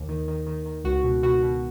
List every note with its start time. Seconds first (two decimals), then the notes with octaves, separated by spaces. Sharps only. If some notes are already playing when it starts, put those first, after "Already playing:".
Already playing: D#2
0.08 D#3
0.28 D#3
0.46 D#3
0.66 D#3
0.84 C#2 F#4
1.03 B2
1.23 B2 F#4
1.42 B2